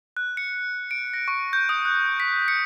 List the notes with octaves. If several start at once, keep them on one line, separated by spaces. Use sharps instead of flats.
F#6
C#7
D7
A#6
C#6
G6
D#6
F#6
B6
C#7